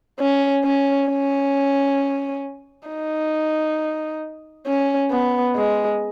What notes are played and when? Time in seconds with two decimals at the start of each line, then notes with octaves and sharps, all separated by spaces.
0.20 C#4
0.64 C#4
1.09 C#4
2.88 D#4
4.67 C#4
5.11 B3
5.56 G#3